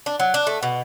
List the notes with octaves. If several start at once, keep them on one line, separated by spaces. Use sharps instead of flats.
D4
F#3
D4
A3
B2